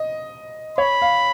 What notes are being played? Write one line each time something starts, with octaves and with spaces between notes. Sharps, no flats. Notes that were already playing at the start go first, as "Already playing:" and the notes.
Already playing: D#5
C#5 B5
F5